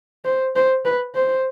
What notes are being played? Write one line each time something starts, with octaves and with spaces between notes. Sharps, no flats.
C5
C5
B4
C5